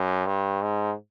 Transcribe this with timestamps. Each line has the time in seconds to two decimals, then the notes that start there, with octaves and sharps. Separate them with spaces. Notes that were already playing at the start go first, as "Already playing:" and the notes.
Already playing: F#2
0.27 G2
0.62 G#2